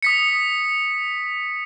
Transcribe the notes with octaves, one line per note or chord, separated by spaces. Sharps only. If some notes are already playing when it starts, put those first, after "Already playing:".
D#6 B6 C#7